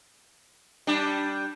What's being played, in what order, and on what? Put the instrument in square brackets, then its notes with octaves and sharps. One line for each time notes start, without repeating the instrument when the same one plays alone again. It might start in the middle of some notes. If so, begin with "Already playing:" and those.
[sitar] G3 D4